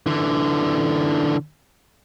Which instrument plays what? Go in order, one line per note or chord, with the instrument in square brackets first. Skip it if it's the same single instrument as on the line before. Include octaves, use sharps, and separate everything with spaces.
[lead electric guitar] D3 E3